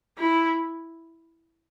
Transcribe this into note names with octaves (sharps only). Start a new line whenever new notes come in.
E4